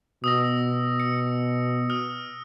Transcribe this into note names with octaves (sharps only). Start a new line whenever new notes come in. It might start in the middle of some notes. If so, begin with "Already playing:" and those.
B2 D#6 E6 A#6
C#7
D#6 F6